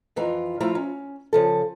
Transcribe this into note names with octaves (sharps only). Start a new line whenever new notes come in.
F2 E3 F4 A#5
F3 A3 E4 F4 F5 A#5
C#4
C#3 F3 A4